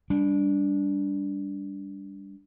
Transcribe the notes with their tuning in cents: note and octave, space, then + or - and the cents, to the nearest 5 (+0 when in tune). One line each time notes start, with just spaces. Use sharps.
G3 +15 D4 -20